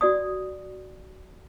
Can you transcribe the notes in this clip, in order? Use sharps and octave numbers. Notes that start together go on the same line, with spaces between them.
F#4 D5 D#6